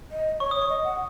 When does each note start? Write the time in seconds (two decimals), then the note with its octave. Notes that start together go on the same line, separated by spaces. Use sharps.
0.11 D#5
0.40 C#5 C#6
0.51 C#5 D#6
0.62 C#6
0.69 D#5
0.84 F#5